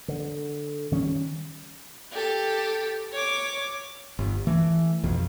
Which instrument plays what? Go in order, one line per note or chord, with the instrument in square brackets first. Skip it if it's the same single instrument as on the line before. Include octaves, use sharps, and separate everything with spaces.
[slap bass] D3
D#3 G3 C#4
[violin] G4 A4
C#5 D6
[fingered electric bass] G1
E3 A3
B1 F2